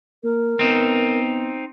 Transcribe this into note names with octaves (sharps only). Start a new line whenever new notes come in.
A#3 A#4
B3 C4 D#4